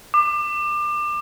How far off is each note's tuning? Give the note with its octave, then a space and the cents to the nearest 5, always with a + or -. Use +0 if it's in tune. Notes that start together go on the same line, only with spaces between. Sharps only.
D6 +30